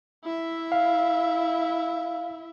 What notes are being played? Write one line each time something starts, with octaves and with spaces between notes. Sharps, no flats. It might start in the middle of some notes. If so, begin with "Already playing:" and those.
E4 E5
F5